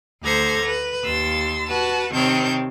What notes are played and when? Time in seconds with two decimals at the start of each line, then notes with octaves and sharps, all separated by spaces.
0.23 D2 A4 C5 A#5 D6 G#6
0.64 B4
1.04 D#2 C6 E6 A6
1.68 F#4 B4 A5
2.12 C3 D#3 C4 C#5 A5 G6